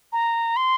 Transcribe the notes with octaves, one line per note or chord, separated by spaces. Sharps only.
A#5
C6